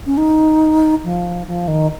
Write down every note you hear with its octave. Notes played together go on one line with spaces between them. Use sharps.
C#4
D#4
F3
F3
D#3